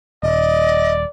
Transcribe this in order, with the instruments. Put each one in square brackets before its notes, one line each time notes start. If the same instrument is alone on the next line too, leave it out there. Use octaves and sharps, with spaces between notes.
[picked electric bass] D#1 [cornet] D5 [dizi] D#5